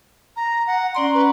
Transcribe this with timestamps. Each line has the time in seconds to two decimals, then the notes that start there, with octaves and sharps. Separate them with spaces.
0.36 A#5
0.67 F#5
0.95 C#4 D5 A#5 C6
1.14 B4